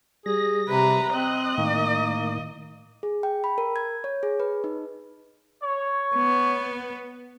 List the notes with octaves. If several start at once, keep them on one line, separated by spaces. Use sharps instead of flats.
G3 G#4 A#6
C3 B4 A#5
C4 D#5 F#6
A2 D#3 A#3
G#4
G5
B5
A#4
G#6
C#5
G#4
B4
D#4
C#5
B3